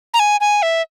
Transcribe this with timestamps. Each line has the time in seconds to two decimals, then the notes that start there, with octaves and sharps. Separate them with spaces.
0.14 A#5
0.19 G#5
0.41 G#5
0.62 E5